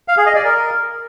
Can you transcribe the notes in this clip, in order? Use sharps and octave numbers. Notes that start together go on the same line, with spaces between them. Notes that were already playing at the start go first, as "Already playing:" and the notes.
F5
G#4
D#5
D5
A#4